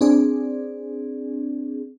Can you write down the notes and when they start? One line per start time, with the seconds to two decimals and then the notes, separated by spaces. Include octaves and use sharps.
0.01 C4 D4 G#4 D5